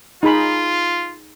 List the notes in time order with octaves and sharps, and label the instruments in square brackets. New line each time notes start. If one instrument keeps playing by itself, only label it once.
[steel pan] D#4 G#4 B5 [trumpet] F4